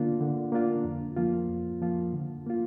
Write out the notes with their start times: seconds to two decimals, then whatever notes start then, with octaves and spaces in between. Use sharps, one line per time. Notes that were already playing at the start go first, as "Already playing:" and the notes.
Already playing: D3 A#3 D4 F4
0.20 D3
0.52 A#3 D4 F4
0.84 F2
1.16 F3 A#3 F4
1.48 F2
1.81 F3 A#3 F4
2.13 D3
2.46 A#3 F4